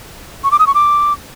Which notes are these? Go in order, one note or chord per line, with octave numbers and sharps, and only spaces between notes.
C#6
D6
D#6
C#6
D6